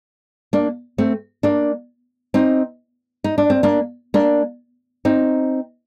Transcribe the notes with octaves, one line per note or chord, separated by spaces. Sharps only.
A#3 D4
A3 C4
A#3 D4
C4 D#4
D#4
D4
C4
A#3 D4
A#3 D4
C4 D#4